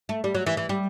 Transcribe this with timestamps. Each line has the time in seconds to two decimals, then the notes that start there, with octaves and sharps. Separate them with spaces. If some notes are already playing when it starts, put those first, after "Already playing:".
0.09 A3
0.24 G3
0.35 F#3
0.46 E3
0.57 E3
0.69 G3